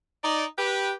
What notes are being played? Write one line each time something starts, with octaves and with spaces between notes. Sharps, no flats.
D#4 D5
G4 B4